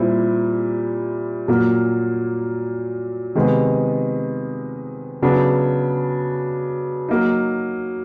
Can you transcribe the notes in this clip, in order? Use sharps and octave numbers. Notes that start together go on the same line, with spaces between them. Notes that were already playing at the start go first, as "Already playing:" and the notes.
Already playing: A#2 G3 C4 E4
A#2 F#3 A#3
C3 D#3 G#3 B3
C#3 F#3 B3 D4
F#3 A#3 D#4